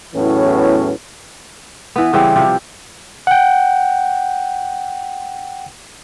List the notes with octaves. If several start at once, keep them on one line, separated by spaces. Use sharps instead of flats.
E2 A2 E3 F#3 B3 C#4
E3 B3
C#3 E3 G3 C4
C3 F3 G3
F#5 G5